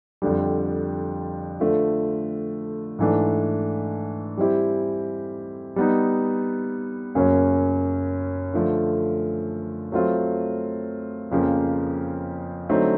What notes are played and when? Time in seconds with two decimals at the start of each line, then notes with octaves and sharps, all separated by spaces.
0.22 F2 D3 G3
1.60 D3 F3 A3
2.99 G#2 E3 A3 D4
4.37 G3 C4 E4 G4
5.76 G3 B3 D#4
7.15 F#2 C#3 F#3 A#3 C#4
8.54 D3 F3 A3
9.92 F#3 A3 C4 F4
11.31 F2 C#3 F3 A#3
12.69 D3 F#3 A3 C4 D#4